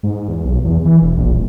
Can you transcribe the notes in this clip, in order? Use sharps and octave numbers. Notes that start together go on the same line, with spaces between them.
G#2
E2
B1
E2
E3
E1
A#1
D#1